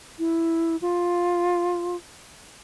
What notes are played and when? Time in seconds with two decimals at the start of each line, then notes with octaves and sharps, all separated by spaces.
0.19 E4
0.82 F4